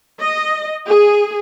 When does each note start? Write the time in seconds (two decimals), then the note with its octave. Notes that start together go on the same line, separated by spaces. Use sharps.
0.20 D#5
0.86 G#4